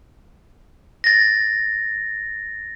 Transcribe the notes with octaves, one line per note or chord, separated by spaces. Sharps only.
A6 A#6